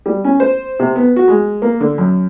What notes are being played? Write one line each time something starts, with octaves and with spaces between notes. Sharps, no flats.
G3
C#4
C5
C3
B3
F#4
G#3
A#3
D3
F#2